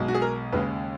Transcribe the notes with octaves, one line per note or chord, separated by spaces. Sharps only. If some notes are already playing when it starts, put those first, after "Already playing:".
Already playing: B1 B2 G#3
F#4
G#4
A#4
D#2 C#3 G#3 B4